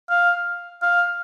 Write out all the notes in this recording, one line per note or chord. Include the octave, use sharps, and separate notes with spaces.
F5
F5